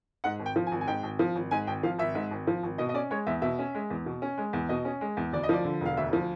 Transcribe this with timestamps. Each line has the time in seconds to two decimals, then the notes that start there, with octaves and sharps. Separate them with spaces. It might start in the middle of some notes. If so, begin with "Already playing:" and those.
0.24 G#2 F#5
0.39 G#1
0.46 G5
0.56 F3
0.67 G#5
0.72 G#1
0.81 G#5
0.88 G#2 G5
1.03 G#1
1.19 F3
1.35 G#1
1.51 G#2 G#5
1.67 G#1 G5
1.83 F3 F5
1.98 G#1 E5
2.15 G#2
2.31 G#1
2.47 F3
2.63 G#1
2.78 B2 D#5
2.89 D#5
2.94 C#4 D5
3.11 G#3 C#5
3.27 E2 E5
3.42 B2 E5
3.59 C#4
3.75 G#3
3.90 E2
4.06 B2
4.22 C#4
4.38 G#3
4.53 E2
4.69 B2 D#5
4.85 C#4
5.01 G#3
5.17 E2
5.32 D2 D5
5.43 D#5
5.49 F3 D5
5.64 D3
5.81 E1 F5
5.97 D2 E5
6.13 F3